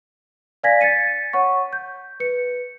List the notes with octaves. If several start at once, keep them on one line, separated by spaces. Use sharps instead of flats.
D5 F5 G#5 G#6 A#6 B6
A6 B6 C#7 D#7
C#5 F#5 C#6
G6
B4 C#7